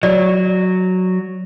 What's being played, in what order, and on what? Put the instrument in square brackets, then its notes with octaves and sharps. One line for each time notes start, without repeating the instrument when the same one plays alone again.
[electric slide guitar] F#3 [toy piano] D5